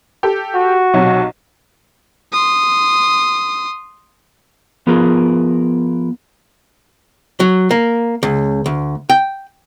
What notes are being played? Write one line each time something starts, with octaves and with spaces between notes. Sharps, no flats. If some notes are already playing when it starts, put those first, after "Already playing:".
G4 A4
F#4
B1 C3 F#3
C6 D#6
F3 B3 F4 G#4 A#4
F#3
A#3
C#2
D2
G5